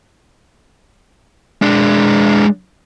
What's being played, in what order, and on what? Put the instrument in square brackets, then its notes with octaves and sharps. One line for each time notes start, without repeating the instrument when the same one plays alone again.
[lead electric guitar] G#3 D4